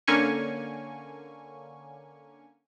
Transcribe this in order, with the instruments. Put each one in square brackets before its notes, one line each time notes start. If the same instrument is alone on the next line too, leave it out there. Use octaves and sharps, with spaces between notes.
[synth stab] D3 A#3 C#4 G#5 C#6